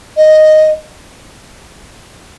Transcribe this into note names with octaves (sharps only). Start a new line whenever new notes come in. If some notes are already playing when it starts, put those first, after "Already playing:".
D#5